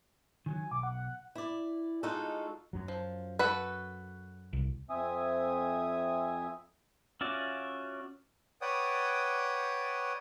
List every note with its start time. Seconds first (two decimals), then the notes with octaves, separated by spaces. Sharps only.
0.46 D#3 E3 F#3 G#5
0.71 B1 D6
0.83 F#5
1.35 E4 D5
2.03 G#3 D#4 F4 F#4 A4
2.73 F#2 F#3
2.88 F3
3.39 F#4 A4 B4
4.53 C2
4.90 F2 C4 E5 G#5 D#6
7.21 C#4 F4 F#4 D5 E5
8.61 B4 C#5 D5 F#5 G5 D#6